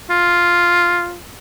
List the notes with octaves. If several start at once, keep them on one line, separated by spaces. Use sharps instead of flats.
F4